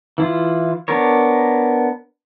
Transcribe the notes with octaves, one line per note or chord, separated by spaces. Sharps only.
E3 E4 F4
B3 D4 A#4 C#5